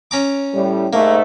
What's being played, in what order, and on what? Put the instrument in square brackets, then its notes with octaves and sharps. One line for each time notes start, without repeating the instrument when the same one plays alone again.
[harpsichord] C#4 A#5 D6
[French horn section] A2 G3
[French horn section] G#2 A3 [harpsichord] A#3